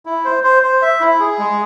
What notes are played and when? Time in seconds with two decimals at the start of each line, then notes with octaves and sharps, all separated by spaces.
0.06 E4
0.25 C5
0.43 C5
0.63 C5
0.82 E5
1.00 E4
1.20 G#4
1.39 G#3